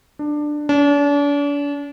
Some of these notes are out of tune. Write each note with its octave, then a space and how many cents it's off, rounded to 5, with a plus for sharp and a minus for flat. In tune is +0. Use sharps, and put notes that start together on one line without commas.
D4 +15
D4 -40